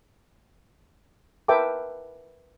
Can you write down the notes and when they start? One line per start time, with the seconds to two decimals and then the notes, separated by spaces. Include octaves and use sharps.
1.48 A#4 B4 E5 G5 A5 D6